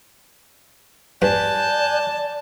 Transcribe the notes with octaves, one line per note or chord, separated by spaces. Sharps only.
G2 D5 G#5 A5 F#6 G6